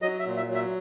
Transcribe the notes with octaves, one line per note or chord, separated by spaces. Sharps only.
F#3 D#5
E5
A#2
E5
F#3
E5